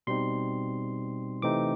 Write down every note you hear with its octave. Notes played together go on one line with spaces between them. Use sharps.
B2 G3 C4 D#4 C6
C3 E3 A3 C4 D#4 D6